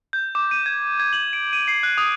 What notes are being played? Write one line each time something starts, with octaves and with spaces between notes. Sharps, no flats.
G6
D6
D#7
G#6
G#6
F#7
D7
D#7
C7
F#6
D#6